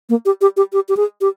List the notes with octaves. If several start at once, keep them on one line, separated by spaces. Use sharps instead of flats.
A#3
G4
G4
G4
G4
G4
G#4
G4